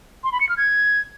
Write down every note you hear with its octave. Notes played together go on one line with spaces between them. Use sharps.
C6
B5
C#7
F6
G#6